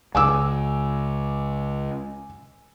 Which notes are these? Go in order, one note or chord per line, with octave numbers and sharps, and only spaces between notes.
C#2 C#3 G#5 D6 E6